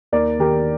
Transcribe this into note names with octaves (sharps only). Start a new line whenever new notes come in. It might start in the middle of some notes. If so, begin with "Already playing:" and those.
D#2 A#4 D5
D#3 G4 A#4